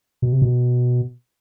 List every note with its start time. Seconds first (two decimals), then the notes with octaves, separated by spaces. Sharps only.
0.22 B2
0.33 C3
0.42 B2